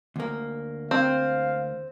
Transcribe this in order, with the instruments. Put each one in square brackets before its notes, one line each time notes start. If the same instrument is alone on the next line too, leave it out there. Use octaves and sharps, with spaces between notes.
[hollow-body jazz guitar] D2 A#3
[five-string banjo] C4 [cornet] F5